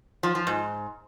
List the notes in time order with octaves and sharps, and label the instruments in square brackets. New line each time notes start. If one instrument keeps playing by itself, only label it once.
[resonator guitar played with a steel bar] F3
F3
G#2